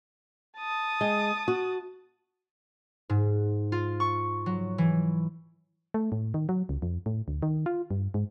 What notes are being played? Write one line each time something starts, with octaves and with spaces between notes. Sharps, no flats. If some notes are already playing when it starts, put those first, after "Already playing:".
A5 D#6
G#3
F#4
G#2
F4
C#6
F#3
E3
A3
A2
D#3
F#3
C#2
F2
A2
D2
D#3
F4
G2
G#2